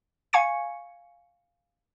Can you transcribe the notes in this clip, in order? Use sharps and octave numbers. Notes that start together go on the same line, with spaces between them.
F5 G#5 C#6 G#6 C#7